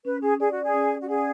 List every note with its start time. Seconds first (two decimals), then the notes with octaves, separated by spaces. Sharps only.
0.05 C#4 B4
0.22 C#4 G#4
0.39 G#4 D5
0.51 F#4
0.57 D5
0.63 G#4
0.74 C#4
0.92 D5
1.01 F#4
1.09 G#4 F#5